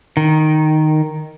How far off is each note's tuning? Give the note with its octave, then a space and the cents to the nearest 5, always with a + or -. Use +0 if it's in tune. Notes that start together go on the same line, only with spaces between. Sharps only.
D#3 -5